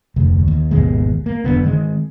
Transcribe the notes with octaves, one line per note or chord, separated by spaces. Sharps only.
F1 D2
D#2
G#1 D#2 B2 G#3
A#3
F#1 F#2 D3 B3
D#3 G#3 C4